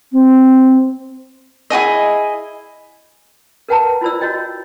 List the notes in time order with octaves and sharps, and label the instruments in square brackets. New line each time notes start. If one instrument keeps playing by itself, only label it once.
[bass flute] C4
[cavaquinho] E4 F#4 G#4 D#5
[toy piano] A#4 B4 F#5 G5 A5 A#5
E4 F4 A#4 C5 D5 E6
F#4 C#5 D#5 G5